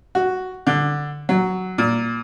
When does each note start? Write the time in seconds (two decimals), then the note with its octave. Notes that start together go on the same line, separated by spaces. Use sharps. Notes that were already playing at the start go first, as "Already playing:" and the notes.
0.15 F#4
0.67 D3
1.29 F#3
1.78 A#2